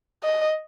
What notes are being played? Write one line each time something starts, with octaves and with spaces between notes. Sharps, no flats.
D#5